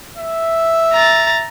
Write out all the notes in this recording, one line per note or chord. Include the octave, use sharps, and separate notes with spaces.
E5
A#5 A6